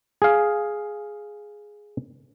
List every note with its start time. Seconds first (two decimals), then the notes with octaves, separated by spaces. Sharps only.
0.22 G#4 F5